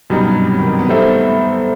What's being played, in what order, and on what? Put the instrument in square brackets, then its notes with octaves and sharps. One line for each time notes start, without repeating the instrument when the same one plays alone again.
[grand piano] F#2 [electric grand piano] B2 G3 D#4
[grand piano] G2
C3
F#3
D#3
C3
B3
[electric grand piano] G3 D#4 A4 C5 E5 [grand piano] A3
[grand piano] B3
A3
A3